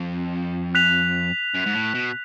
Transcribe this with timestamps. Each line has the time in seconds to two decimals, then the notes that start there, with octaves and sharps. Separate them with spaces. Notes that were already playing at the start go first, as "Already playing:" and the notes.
Already playing: F2
0.75 F#6 B6 F7
1.55 F#2
1.66 G#2
1.74 A2
1.95 B2